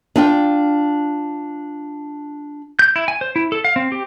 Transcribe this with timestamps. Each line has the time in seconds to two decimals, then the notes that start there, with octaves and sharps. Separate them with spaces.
0.16 D4 F4 G5
2.79 G6
2.96 E4
3.08 G#5
3.21 C5
3.36 E4
3.52 A4
3.64 F5
3.76 C4
3.92 G4